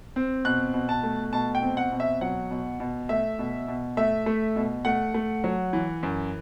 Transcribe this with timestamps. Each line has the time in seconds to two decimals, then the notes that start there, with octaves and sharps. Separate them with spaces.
0.16 C4
0.45 B2 F#6
0.74 B2
0.89 A5
1.03 A3
1.33 B2 A5
1.55 G5
1.62 C4
1.77 F#5
1.92 B2
2.00 E5
2.21 F#3 F#5
2.51 B2
2.80 B2
3.09 A3 E5
3.39 B2
3.68 B2
3.97 A3 E5
4.26 A3
4.56 B2
4.85 A3 F#5
5.14 A3
5.44 F#3
5.73 E3
6.03 F#2